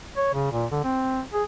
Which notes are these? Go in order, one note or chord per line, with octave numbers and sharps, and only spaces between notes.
C#5
C#3
A#2
D3
C4
G#4